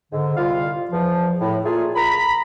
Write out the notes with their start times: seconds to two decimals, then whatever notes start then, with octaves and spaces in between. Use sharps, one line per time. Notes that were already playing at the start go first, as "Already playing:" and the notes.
0.12 G#2 D3
0.37 C2 G3 F4 F5
0.91 E2 F3
1.40 A2
1.65 A#2 A3 F4 G#4
1.96 A#5 B5